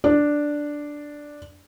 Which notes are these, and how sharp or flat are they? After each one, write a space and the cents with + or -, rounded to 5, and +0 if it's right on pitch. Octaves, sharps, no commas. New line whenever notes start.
D4 +0 D5 +0